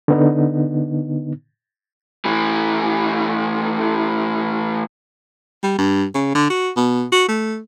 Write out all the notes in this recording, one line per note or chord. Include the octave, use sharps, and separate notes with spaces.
D3 B3 D#4
A2 E3
G3
G2
C#3
D3
F#4
B2
F#4
A3